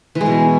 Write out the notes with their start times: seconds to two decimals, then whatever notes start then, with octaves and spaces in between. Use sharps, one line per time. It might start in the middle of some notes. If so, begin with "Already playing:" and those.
0.15 E3
0.21 G#3
0.26 B2